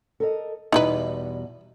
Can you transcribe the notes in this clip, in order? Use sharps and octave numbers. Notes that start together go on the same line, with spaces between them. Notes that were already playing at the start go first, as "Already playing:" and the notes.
A4 A#4 D#5
E2 B2 G3 D#4 E4 B4